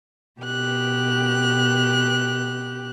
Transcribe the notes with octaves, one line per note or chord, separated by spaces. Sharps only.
B2 G4 F#6